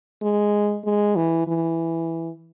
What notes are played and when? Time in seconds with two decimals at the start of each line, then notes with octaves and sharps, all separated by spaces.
0.22 G#3
0.85 G#3
1.16 E3
1.47 E3